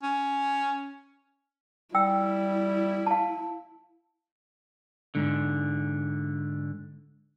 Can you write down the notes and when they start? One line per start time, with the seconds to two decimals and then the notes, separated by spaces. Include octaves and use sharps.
0.03 C#4
1.95 G3 E4 G5 E6
3.07 F5 A5
5.15 G#2 D3